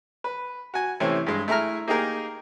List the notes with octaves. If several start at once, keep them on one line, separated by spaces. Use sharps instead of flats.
B4
F#4 G#5
C3 E3 A3 C4 C#4
G2 G#3
A3 E4 G#4 A#5 F6
A#3 D#4 G4 G#4 A#4